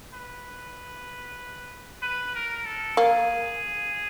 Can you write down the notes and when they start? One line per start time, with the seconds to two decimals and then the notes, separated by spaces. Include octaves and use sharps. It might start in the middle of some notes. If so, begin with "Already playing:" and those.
0.14 B4
2.02 B4
2.35 A#4
2.66 A4
2.97 A#3 G#4